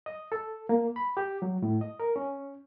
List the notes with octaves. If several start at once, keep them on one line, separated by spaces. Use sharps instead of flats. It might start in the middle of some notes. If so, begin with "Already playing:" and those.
D#5
A4
A#3
B5
G4
F#3
A2
D#5
A#4
C#4